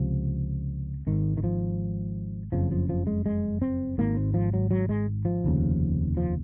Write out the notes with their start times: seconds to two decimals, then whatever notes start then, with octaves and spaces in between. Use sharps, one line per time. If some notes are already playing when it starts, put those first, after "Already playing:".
Already playing: C#2 C3 F3
1.07 G#1 G#2 D#3
1.37 D#3
1.44 F3
2.52 F#1 F2 C#3 F3
2.72 F3
2.89 F3
3.07 G#3
3.26 G#3
3.62 C4
3.98 G#1 G#2 A#3
4.17 C4
4.34 F3
4.53 F#3
4.71 F#3
4.89 G#3
5.25 F3
5.44 F1 D#2 C#3
6.17 F3